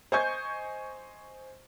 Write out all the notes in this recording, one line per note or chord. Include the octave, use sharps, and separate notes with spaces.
C5 D#5 G#5 C#6 G6 G#6